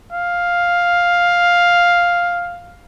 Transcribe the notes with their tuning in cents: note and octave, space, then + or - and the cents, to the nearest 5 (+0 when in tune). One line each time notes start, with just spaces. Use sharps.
F5 +5